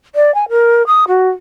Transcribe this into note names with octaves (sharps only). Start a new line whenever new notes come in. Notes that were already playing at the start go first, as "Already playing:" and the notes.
D5
G#5
A#4
D#6
F#4